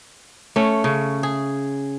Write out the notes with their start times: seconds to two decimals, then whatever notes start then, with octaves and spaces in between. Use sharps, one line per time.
0.56 A3 C#4
0.84 C#3
1.23 G#4